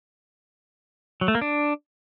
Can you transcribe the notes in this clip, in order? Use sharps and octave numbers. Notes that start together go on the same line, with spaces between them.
F#3
A3
A#3
D4